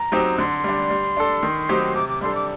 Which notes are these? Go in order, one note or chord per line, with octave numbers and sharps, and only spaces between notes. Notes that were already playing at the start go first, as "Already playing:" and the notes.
Already playing: A#5
F#3 C4 D#4 G4
D3 C6
G3 D4
G3
D4 A4
D#3
F#3 C4 D#4 G4
C3 D6
D6
G3 D4 A4 C6
D6